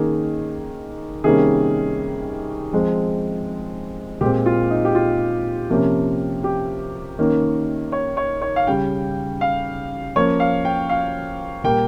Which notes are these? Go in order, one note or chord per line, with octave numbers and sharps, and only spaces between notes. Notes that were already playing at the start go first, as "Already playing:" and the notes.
Already playing: D#3 A#3 C#4 G#4
C3 D#3 G3 A#3 C#4 G#4
F3 G#3 C4
A#2 G#3 C4 G4
F4
D#4
G4
F4
C3 F3 A#3 C#4
G4
D#3 A#3 C#4
C#5
C#5
C#5
F5
C#3 G3 C#4 G5
F5
F3 A#3 C#4 C#5
F5
G5
F5
A#2 G3 A#3 G5